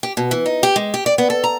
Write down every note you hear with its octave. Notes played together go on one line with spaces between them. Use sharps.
G4
B2
E3
D#4
G4
G#3
G4
D5
B3
A4
A#5